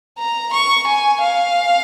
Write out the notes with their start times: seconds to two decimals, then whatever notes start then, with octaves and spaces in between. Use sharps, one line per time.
0.19 A#5
0.54 C#6
0.87 G#5
1.21 F5